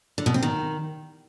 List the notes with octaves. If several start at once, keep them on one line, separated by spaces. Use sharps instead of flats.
D3
B2
C4
D#3